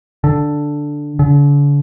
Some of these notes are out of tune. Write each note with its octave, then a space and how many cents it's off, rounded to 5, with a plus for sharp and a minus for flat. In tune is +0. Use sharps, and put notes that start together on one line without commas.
D3 +0
D3 -40